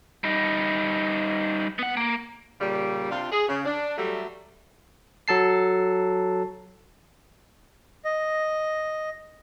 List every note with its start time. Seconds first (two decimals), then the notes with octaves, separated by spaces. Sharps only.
0.24 G3 D#4
1.79 B3 F#5
1.97 A#3
2.61 A#2 C#3 G3
3.11 C3 D4 F4
3.32 G#4
3.48 C#3
3.66 D4
3.97 F#3 G3 A3
5.28 F#3 A4 A5 C7
8.05 D#5